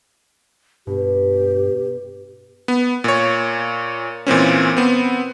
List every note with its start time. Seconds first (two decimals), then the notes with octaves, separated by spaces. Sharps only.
0.87 G2 B2 G4
2.68 B3
3.04 A#2 C#5
4.27 A#2 E3 C4 C#4
4.77 B3 C4